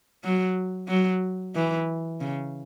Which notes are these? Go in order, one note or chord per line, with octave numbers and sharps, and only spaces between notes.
F#3
F#3
E3
C#3